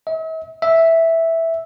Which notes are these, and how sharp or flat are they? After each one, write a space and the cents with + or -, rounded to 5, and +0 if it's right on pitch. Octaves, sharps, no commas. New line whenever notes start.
E5 -45
E5 -5